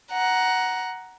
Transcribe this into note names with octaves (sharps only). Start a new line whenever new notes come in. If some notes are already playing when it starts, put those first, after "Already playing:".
F#5 A#5